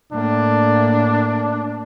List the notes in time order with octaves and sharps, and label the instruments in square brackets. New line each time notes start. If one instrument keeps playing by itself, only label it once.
[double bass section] A2 A#3 [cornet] D4